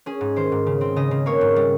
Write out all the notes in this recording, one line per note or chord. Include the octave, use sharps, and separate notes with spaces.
C#4 G#4
G#2
D#3 C5
G#2
C#3
C4
C#3 D#5
C#3
A#3 C#5
G#2
G3